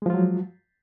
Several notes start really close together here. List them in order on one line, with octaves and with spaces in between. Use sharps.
G#3 F3 F4 F#3